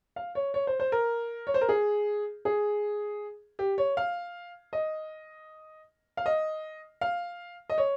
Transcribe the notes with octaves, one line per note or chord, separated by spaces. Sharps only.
F5
C#5
C#5
C5
C5
A#4
C#5
C5
A#4
G#4
G#4
G4
C#5
F5
D#5
F5
D#5
F5
D#5
C#5